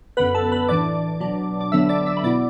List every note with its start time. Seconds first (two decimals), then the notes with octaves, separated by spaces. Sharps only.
0.17 F#2 D3 B3 B4 B5
0.34 A4 A5
0.52 B4 B5
0.68 A2 E3 D4 D5 D6
1.20 B2 F#3 D4
1.61 D6
1.72 D3 F#3 B3 D4 E5 E6
1.89 D5 D6
2.06 E5 E6
2.17 B5
2.24 B2 B3 E4 D5 D6